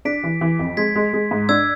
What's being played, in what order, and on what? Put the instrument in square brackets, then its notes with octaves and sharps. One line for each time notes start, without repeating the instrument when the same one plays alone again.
[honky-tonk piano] D4 [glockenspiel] B6 D7
[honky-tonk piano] E3
E3
F2
[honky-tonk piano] G#3 [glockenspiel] G#6 B6
[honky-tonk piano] G#3
G#3
G#2
[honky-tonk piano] D4 [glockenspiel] E6 G#6